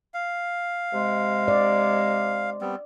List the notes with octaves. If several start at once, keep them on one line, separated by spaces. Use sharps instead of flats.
F5
C3 G#3
D5
G3 B3 C4